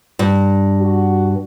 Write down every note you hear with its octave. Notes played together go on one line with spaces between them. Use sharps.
G2
F#4